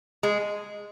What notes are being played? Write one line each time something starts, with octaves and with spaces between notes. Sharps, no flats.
G#3